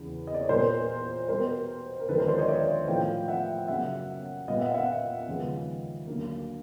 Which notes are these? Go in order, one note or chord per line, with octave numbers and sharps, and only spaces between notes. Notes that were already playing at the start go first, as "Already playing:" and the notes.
Already playing: E2 C#3 E3
D#5
D5
C#5
A#2 G3 B3 A#4 C5
B2 G3 B3 A#4 C5
A#4
D#2 D3 F3 G#3 A4 B4
A#4 C5
C5 D5
C#5 D#5
D5 E5
A2 F3 A3 F5 G5
E5 F#5
F#2 C#3 F#3 E5 F#5
A#2 G3 B3 D#5 F5
E5 F#5
F5
E5 F#5
D#2 C#3 F3 G#3 B3
D2 D3 F#3 A#3